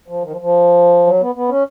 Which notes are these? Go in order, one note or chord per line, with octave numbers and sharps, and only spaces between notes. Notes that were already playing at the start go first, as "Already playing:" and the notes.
F3
D#3
F3
F3
F#3
B3
B3
C#4